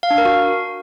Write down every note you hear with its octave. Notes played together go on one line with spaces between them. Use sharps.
F5
D4
A#4
F#4